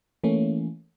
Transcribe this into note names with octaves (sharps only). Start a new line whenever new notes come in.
E3 A3 A#3 C#4